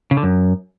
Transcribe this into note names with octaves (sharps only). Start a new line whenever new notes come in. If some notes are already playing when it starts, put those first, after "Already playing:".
C#3
D3
F#2